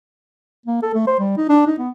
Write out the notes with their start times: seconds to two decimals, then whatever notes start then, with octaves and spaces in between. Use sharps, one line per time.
0.66 A#3
0.82 A4
0.94 A3
1.07 C5
1.19 G3
1.37 D#4
1.49 D4
1.67 D#4
1.79 B3